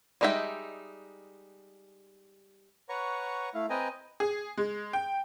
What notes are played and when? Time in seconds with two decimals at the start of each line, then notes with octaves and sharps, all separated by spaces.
0.21 G3 G#3 D#4 E5 G5
2.89 B4 C#5 F#5 A#5 C#6
3.54 A3 E4 F5
3.70 C4 B4 D#5 G5 G#5 A#5
4.20 G#4
4.58 G#3
4.93 G5